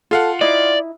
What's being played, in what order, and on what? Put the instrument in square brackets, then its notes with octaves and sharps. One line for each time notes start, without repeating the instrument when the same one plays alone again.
[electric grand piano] F4 F5 F#5 [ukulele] A4
[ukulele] D#4 E4 D#5 [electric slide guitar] D5